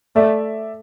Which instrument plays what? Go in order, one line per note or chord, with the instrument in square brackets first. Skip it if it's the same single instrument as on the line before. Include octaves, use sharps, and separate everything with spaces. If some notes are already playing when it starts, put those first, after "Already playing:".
[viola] A3 [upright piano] D5 E5